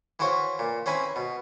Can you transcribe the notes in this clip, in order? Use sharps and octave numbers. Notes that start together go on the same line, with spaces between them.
E3 E4 F#4 C5 C#5 F5
A#2
C4 C#4 E4 B4 G#5
B2